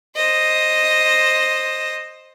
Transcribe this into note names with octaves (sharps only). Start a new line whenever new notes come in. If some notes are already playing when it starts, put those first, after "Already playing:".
C5 D#5